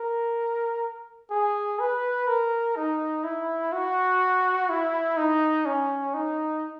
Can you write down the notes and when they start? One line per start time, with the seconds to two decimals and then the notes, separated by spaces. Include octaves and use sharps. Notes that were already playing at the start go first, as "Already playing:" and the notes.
Already playing: A#4
1.31 G#4
1.80 B4
2.28 A#4
2.76 D#4
3.24 E4
3.73 F#4
4.69 E4
5.17 D#4
5.66 C#4
6.14 D#4